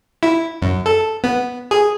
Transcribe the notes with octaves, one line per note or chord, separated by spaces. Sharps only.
E4
F#2
A4
B3
G#4